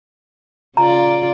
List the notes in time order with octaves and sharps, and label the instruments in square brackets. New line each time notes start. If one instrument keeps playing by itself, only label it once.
[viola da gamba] C#3 F4 D5 [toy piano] A#5